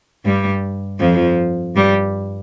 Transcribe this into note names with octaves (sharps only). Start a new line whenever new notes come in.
G2 G3
F2 F3
G2 G3